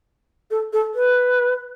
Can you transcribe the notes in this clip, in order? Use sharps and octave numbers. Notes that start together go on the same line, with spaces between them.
A4
A4
B4